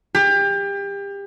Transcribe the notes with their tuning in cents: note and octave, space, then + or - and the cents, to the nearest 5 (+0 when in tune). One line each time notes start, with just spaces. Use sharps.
G4 +30